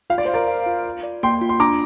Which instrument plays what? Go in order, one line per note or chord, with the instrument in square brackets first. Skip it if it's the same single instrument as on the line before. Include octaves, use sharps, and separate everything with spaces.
[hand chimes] F4 [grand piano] F5
[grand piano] D5
[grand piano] C5 [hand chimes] F5
[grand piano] A#4 D5
[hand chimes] F5
F4
F4
D5
[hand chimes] A#3 [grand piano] G5 C6
[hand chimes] F4
[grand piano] C6
[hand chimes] D4 [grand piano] A#5 D6